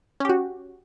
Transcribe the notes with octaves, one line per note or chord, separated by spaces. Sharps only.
C#4 F#4 G4